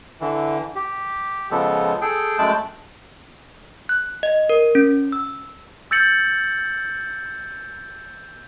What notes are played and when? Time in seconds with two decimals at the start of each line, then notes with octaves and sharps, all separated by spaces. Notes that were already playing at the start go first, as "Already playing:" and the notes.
0.21 D3 E3
0.75 G4
1.51 C#3 F3 G#3 B3 A4
2.01 G#4 A4 G5
2.39 F#2 G#3 A3 G5 A5 F#6
3.89 F#6
4.23 D#5
4.49 A#4
4.75 C#4
5.12 E6
5.91 E6 G6 A6 C#7 F#7